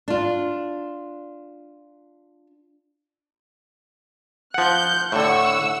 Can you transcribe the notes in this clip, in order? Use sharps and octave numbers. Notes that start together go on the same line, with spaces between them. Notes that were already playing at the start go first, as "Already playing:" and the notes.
D4 F4
F3 F#5 F#6 G6
A2 D3 F#5 C#6 E6